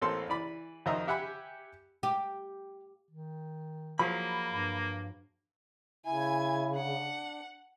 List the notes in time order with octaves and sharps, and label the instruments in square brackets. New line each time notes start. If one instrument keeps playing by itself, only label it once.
[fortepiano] A1 A#3 C4 A4 C6
E3 D5 B5
F2 D#3 C5 D#5 E5 A#5
G4 E5 F#5 G#5 B5
[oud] G4
[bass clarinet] D#3
[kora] F3 F#3 G#4 [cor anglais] A#3 [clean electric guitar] B5
[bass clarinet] G2
[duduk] C#3 [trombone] E4 [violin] G#5 G#6
[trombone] D4 [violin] F#5